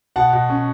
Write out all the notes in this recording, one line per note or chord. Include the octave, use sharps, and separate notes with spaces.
B2 F#5 A5
B2
C#4